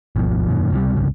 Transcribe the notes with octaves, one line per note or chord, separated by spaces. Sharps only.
G#1 D#2 B2 F3
E1 F#2 A#2 D#3
C#2 C3 E3 G3
C2 G2 C#3